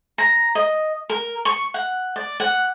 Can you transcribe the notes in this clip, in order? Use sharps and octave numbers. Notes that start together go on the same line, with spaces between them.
A#5
D#5
A#4
C#6
F#5
D5
F#5